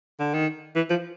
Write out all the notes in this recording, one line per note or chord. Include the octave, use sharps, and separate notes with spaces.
D3
D#3
E3
F3